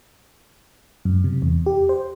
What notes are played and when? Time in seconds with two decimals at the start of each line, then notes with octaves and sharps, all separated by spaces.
1.05 F#2
1.24 C3
1.42 E2
1.66 G4
1.89 C5